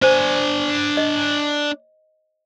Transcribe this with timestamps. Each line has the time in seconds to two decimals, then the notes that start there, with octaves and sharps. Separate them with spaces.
0.02 D4 C5 G#5
0.97 D#5